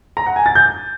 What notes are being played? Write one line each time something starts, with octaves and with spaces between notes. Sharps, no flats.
A#5
F#5
G#5
A6
G6